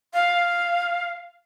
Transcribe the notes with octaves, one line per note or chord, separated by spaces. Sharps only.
F5